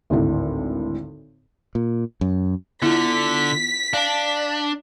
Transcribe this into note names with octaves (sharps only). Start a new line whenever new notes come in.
G#1 D2 A2
A#2
F#2
D3 B3 E4 F4 B6
D4 F5 A5